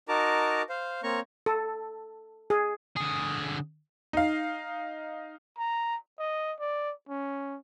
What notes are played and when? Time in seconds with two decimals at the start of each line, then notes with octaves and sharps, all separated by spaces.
0.08 D#4 F#4 A#4 A5 A#5 D6
0.69 C5 F5
1.03 A#3 C4 C#5 A#5 C#6
1.46 A4
2.50 G#4
2.96 D3 G#4
4.13 D#4 F5
5.58 A#5
6.19 D#5
6.60 D5
7.09 C#4